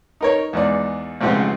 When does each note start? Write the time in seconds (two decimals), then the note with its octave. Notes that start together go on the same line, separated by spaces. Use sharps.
0.21 D#4 A#4 C#5
0.53 E2 G#2 D5
1.21 A1 G#2 C#3 F3 C4 F#5